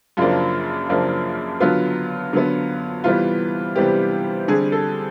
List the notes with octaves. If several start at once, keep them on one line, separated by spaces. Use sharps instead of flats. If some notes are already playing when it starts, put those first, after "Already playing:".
F#2 C#3 F3 A#3 D4 F4
F#2 C#3 F3 A#3 D4
D3 F#3 B3 F4
D3 F#3 B3
C3 E3 G3 B3 F4
C3 E3 G3 B3 G4
D3 G3 C4 G#4
A4